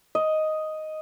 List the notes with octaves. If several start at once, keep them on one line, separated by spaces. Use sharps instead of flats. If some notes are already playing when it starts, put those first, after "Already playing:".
D#5